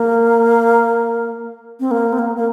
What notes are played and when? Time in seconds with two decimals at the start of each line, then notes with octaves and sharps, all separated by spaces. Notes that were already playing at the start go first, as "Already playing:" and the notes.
Already playing: A#3
1.80 C4
1.91 A#3
2.13 C4
2.19 A#3
2.36 A#3